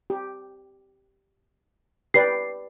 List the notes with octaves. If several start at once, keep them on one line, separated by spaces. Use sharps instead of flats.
G4
G4 B4 D5 C7